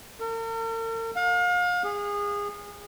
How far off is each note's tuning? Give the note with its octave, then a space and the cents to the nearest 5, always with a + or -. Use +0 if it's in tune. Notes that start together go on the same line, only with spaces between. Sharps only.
A#4 -45
F5 +35
G#4 -25